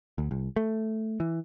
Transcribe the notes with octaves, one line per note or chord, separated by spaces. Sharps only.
D2
C2
A3
E3